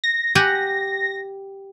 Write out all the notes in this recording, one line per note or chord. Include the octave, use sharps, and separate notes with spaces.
A#6
G4 F#5 G#5